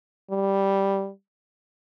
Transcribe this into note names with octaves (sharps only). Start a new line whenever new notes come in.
G3